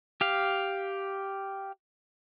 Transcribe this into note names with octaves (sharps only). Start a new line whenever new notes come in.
G4 F5